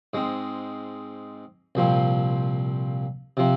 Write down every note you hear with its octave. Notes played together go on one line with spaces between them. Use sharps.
G#2 G#3 C4
C2 A#2 F3 C4
C3 F3 C4